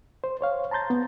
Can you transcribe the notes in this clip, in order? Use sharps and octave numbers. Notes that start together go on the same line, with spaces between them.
C5
C5 C#5 F5
A5 A#5 C6 G6 A6
B3